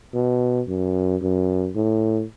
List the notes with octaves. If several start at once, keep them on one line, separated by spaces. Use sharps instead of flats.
B2
F#2
F#2
A2